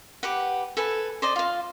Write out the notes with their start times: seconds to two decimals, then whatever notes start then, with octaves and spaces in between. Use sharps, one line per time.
0.23 G4 B4 F#5
0.77 A4 B4 G#5
1.22 C5 D5 D#5
1.36 F4 F5